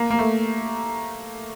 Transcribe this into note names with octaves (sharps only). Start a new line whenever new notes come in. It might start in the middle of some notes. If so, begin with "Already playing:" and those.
Already playing: A#3
A#3
A3